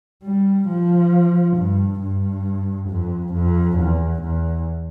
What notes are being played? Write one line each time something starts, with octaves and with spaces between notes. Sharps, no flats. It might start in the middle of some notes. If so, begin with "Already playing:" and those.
G3
F3
G2
G2
F2
F2
E2
E2